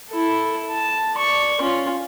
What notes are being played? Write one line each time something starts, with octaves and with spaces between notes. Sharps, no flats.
E4 A4
A5
D5 C#6
C#4 F4